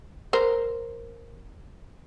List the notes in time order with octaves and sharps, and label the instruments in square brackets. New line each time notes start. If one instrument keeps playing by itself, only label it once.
[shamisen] A#4 C5